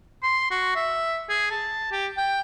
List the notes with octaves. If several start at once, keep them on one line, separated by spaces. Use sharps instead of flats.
C6
F#4
E5
G#4
A5
G4
G5